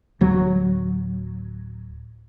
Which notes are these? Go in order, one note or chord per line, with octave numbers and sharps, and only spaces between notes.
D1 F#3